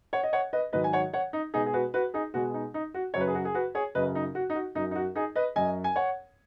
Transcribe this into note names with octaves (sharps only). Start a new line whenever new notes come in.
C#5 F#5
D#5
C#5 F#5
B4 D#5
G#2 D#3 F#3 B4 D#5
G#5
C#5 F#5
C#5 F#5
D#4
B2 G#3 D#4 G#4
G#4
F#4 B4
F#4 B4
D#4 G#4
B2 G#3 F#4
D#4
D#4
F#4
F#2 C#3 F#3 C#5
B4
G#4
F#4
G#4
F#4 B4
G#4 C#5
F#2 C#3 F#3 B4 D#5
D#4
F#4
D#4
F#4
F#2 F#3 D#4
D#4
F#4
D#4 G#4
B4 D#5
F#2 F#3 D#5 G#5
G#5
C#5 F#5